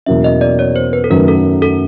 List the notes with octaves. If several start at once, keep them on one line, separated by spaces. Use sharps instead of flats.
E2 B2 F#3 A#3 C#4 E5
D#5
D5
C#5
C5
B4
A4
F#2 D#3 F#3 A3 A#4
A4
A4